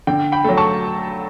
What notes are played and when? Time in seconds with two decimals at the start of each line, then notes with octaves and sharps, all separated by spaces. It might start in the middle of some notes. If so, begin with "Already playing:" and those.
0.07 D3 G5
0.32 G5 B5
0.44 F#3 A3
0.57 A5 C#6